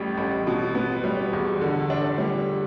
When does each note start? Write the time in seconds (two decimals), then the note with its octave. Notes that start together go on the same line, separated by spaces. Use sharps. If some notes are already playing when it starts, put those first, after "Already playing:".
Already playing: A1 A2 G3
0.18 A1
0.47 B2
0.75 B3
1.04 G3
1.33 E2
1.61 D3
1.90 D4
2.18 G3